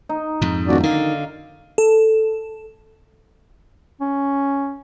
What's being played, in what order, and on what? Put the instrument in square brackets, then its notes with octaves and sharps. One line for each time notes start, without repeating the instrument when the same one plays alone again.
[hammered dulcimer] D#4
[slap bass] F2 G#2
[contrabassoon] D#1 [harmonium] D#3 F#4 D5
[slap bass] D3 [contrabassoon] D#3 [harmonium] F5
[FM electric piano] A4
[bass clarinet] C#4